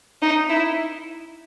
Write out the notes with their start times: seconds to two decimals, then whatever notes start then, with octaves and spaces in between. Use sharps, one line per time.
0.22 D#4
0.50 E4